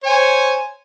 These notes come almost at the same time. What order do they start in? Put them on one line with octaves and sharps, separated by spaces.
C#5 G#5 C5